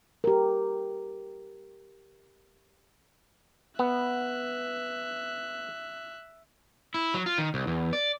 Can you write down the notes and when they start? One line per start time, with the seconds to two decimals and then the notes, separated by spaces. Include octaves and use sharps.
0.24 G4 A#4
3.79 B3 E5 F#6
6.94 E4
7.14 F#3
7.26 F4
7.38 D#3
7.54 C2
7.67 E2
7.93 D5